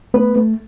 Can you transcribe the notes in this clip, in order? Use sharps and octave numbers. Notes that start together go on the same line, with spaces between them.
A3 B3 B4
A3